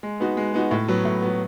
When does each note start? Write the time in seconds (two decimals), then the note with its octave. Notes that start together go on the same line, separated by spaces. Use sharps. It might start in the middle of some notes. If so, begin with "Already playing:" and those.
0.03 G#3
0.20 B3 D#4 F#4
0.37 G#3
0.54 B3 D#4 F#4
0.71 A2
0.88 F#3 B3
1.05 A2
1.22 F#3 B3